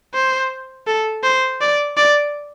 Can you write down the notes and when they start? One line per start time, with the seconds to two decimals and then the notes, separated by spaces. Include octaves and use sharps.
0.14 C5
0.87 A4
1.23 C5
1.61 D5
1.97 D5